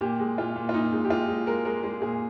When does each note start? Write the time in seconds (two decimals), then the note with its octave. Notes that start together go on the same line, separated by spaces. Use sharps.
0.01 A#2 G4
0.19 G#3
0.38 A#2 F4
0.55 A#2
0.69 F4
0.74 A#2 D#4
0.92 G#3 D#4
1.05 G4
1.10 G#3 F4
1.29 G#3
1.46 G#3 A#4
1.65 G#3 A#4
1.83 G#3 G#4
2.02 A#2 G#4